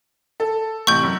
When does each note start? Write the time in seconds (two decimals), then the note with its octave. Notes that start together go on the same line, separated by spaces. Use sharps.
0.40 A4
0.87 A1 C3 C#6 G6 F#7
1.03 F#2